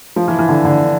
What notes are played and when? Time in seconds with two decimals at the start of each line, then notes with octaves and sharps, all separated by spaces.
0.16 F3
0.28 E3
0.39 E3
0.49 D3
0.65 D3